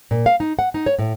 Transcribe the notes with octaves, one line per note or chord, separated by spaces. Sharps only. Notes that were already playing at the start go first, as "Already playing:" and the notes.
A#2
F5
D#4
F#5
D#4
C#5
A2